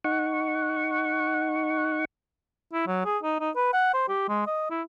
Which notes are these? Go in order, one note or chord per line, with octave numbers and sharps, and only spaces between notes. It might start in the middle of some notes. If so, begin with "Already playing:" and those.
D#4 F#5 C#6
E4
F#3
G#4
D#4
D#4
B4
F#5
C5
G4
G#3
D#5
E4